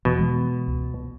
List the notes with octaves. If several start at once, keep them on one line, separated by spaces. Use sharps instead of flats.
E2 B2 E3
E3 G#3
C#2